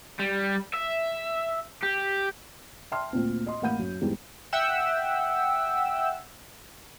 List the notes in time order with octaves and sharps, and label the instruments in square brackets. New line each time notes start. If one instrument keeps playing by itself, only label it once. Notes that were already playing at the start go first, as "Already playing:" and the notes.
[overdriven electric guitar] G3
E5
G4
[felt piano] E5 G5 A5 C6 F6
D2 A#2 C4
D#5 C6
A1 A#3 F#5 B5 G6 D#7
F#2
E2 G#2 G3 G#3
[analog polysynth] E5 F#5 G5 E6